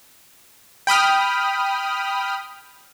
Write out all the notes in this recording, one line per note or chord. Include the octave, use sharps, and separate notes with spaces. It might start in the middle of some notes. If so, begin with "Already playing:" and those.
G5 B5 D#6 F6